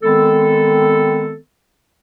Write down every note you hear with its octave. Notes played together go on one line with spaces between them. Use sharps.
D#3 G#3 B3 C4 A4